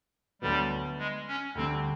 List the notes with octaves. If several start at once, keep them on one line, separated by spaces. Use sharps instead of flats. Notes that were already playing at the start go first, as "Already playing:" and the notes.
D2 D3 F#3 G3 B3
G#3
C#4
D2 D3 G3 C4